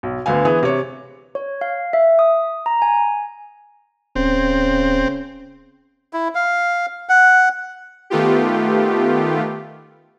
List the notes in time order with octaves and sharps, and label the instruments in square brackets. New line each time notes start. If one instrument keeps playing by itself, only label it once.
[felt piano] B1
D2 D3 B3 F5 G#5
E3 B3 G#4
C3 C#5
[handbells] C#5
F5
E5
D#6
A#5
G#5
[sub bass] D1 [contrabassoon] C#3 [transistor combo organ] C4
[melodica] E4
F5
F#5
[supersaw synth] D#3 A3 B3 F4 G4